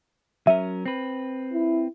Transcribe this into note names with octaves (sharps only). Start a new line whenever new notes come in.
F#3 C#4 A#4 E5 D#7
C4 B4
E4